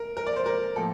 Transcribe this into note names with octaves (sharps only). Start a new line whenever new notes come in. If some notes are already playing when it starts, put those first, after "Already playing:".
Already playing: A#4
A#4
D5
C5
A#4
A2 F3 A#3 A4